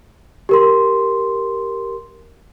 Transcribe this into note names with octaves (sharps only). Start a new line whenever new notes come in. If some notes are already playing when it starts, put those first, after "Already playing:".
G4 A#4 C6